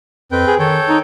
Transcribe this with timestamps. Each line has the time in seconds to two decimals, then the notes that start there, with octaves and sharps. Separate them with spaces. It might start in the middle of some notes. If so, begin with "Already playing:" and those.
0.32 F2 C4 B4 G5
0.47 G#4
0.59 D#3 A4 C#5 G5
0.89 D#4